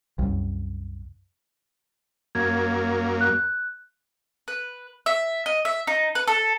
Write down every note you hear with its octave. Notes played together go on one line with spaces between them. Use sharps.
C2 F#2
F#2 A#3 G#6
F#6
B4
E5
D#5
E5
D#4
B4
A4